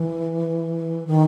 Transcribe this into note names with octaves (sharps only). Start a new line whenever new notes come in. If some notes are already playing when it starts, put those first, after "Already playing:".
Already playing: E3
D#3